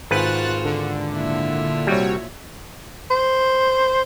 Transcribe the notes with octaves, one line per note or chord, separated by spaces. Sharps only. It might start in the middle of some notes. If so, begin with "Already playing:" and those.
G#1 G#2 F4 F#4 B4 C5 F#6 A6
D3
A#2 E4 F4
C2 G3 F#4 C#5
C5